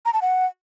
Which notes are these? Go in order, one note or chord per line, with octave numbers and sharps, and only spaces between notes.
A#5
A5
F#5